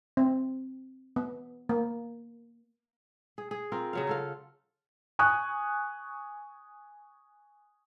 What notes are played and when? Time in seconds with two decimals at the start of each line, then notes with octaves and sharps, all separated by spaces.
0.17 C4
1.16 B3
1.69 A#3
3.38 G#4
3.51 G#4
3.72 C4 F4 A#4
3.93 C#3 F#3 F5
4.07 F4 A4 F5
5.19 G#5 C#6 D#6 F#6